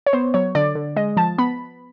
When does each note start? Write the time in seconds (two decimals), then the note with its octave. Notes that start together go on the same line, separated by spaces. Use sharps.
0.06 C#5
0.13 B3 C5
0.34 F#3 C#5
0.55 D3 D5
0.75 D3
0.96 G#3 D#5
1.17 F3 A5
1.38 B3 B5